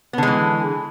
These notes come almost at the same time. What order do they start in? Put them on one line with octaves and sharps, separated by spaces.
B3 D3 G#3 E3